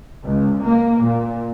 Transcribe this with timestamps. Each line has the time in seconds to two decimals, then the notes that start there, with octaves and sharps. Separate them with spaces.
0.25 C#2
0.62 A#3
1.02 A#2